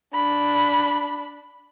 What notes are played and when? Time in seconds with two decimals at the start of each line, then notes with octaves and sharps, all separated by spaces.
0.14 D4 B5